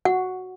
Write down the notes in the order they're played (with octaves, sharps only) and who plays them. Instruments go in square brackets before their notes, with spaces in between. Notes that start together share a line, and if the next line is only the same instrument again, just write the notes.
[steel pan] F#4 [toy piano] F#5